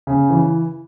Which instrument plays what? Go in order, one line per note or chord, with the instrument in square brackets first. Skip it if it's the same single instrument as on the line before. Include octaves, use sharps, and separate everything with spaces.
[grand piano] C#3
E3